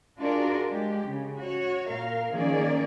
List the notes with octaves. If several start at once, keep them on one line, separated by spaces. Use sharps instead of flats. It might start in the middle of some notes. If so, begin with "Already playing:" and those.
D4 F4 F#4 G#4 A#4 D5
G#3 G4
C#3
F#4 C#5
A#2 A#4 F5
D#3 F3 A#3 C#4 G#4 D5